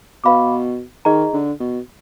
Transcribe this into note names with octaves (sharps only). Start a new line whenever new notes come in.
B2 B4 F5 B5 D6
D#3 D#4 G#4 D#5 A#5
D3
B2